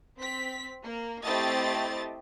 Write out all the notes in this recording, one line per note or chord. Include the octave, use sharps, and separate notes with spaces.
C4 B6
A#3
A3 C4 E4 G4 D#5 A6